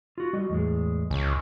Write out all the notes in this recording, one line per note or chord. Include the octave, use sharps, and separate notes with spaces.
F4 F#4
G3 F#4 D#5
E2 A2 G#3
C#2 G#5